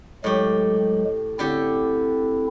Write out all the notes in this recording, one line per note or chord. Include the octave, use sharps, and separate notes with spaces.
A2 F#3 G#3 G4
D3 C4 E4 G4